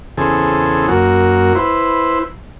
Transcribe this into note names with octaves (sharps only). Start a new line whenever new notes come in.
E2 C#3 C4 G#4 A4
F#2 A#3 F#4
E4 B4 C5